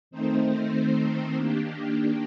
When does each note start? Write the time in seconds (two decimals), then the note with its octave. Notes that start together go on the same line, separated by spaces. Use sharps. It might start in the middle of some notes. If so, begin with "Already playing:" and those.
0.11 D#3 A3 C4 D#4 C5
1.34 D#3 A#3 D4 G4